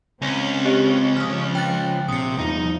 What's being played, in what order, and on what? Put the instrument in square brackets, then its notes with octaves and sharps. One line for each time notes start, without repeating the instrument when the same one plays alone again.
[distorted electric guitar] C#2 [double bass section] C4 [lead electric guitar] C#4
[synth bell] G4 D#5
[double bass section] F3 [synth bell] D#6 F6
[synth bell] G5 F#6 A6
[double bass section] A#1 [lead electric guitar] C3 [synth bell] D#6 C#7
[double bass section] E2 G2 F3 [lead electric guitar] D#4